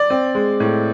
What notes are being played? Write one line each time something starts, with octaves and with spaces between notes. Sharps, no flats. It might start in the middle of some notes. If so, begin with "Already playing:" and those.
Already playing: D5
C4
G#3
A2